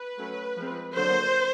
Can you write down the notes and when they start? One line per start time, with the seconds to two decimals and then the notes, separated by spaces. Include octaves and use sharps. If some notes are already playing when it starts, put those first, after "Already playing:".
Already playing: B4
0.17 F#3 A3 C#4
0.56 F3 G#3 C4
0.96 D3 F#3 A#3 C5